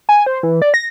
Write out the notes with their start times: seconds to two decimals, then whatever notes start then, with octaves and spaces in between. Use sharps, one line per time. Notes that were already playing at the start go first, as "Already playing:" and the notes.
0.09 G#5
0.26 C5
0.43 E3
0.62 D5
0.74 A#6